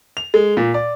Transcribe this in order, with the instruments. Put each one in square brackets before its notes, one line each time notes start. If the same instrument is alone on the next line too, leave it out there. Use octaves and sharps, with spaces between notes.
[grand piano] F7
G#3
A#2
D5